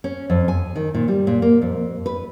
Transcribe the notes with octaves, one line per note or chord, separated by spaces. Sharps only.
C#4
F2
G#5
D#3
A#2
G3
A#2
A#3
F2
B4